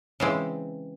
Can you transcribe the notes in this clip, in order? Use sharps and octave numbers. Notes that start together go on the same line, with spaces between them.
C#3 E3 G#3 C4